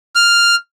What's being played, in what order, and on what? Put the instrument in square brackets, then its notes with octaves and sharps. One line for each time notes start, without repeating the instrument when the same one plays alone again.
[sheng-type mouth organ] F6